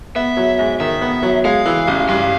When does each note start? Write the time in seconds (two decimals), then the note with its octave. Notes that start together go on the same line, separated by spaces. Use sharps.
0.15 B3 E5
0.37 F#3
0.58 G#2
0.80 D#3 E5
1.02 B3
1.23 F#3
1.45 G#3 F5
1.66 E3
1.87 A1
2.09 G2 F5